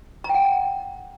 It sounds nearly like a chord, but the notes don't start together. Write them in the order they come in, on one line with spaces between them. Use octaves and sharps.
A#5 G5 F#5